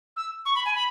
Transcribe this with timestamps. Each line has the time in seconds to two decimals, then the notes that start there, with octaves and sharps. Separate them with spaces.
0.17 E6
0.46 C#6
0.55 B5
0.65 G#5
0.75 B5